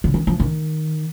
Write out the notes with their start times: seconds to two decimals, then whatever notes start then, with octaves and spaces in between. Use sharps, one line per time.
0.04 D3
0.14 D#3
0.27 F3
0.40 D#3